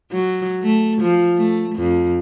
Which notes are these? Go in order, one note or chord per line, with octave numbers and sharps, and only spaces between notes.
F#3
A3
F3
A3
F2